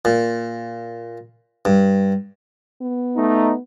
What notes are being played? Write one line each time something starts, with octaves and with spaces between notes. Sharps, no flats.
A#2
G2
B3
A3 D#4